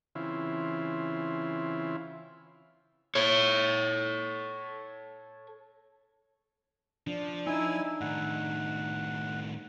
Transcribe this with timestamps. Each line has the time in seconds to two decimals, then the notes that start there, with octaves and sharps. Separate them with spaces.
0.15 C#3 E3 C4 E4 F4
3.15 A4 C#5
7.07 F3 D4
7.47 D#4 E4 G#5 E6
8.01 A2 D#3 F#5